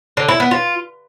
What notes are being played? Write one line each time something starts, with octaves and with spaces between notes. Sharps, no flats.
D3
E4
B3
F4